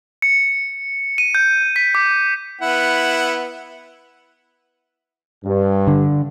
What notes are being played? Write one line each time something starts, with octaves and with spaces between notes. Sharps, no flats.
C#7
D#7
G6
B6
D6
B3 E4 F#5
G2
D3